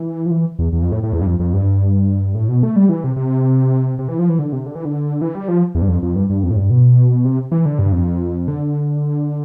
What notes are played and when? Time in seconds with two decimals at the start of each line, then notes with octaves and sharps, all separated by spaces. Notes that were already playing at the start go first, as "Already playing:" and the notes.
Already playing: E3
0.26 F3
0.31 E3
0.59 E2
0.73 E2
0.82 F2
0.92 A2
1.03 A2
1.13 E2
1.22 G2
1.26 F2
1.40 F2
1.54 G2
2.35 A2
2.48 B2
2.63 A3
2.76 G3
2.89 E3
3.04 C3
3.16 C3
3.99 C3
4.08 E3
4.19 F3
4.29 E3
4.39 D3
4.53 C3
4.66 D3
4.75 E3
4.85 D3
5.21 E3
5.35 G3
5.48 F3
5.75 E2
5.82 G2
5.88 F2
6.03 F2
6.16 G2
6.30 G2
6.43 F2
6.51 A2
6.56 G2
6.70 B2
7.25 C3
7.52 E3
7.66 D3
7.79 G2
7.92 F2
8.48 D3